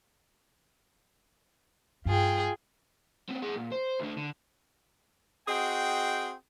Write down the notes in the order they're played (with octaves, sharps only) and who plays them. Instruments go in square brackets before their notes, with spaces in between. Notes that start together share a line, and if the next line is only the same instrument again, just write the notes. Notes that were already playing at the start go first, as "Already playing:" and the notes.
[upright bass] G2 [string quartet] F4 G#4 G5
[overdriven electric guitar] B3 C4
G#4 F#5
A#2
C5
D2 D3
D3
[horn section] C4 F#4 G#4 D#5 G5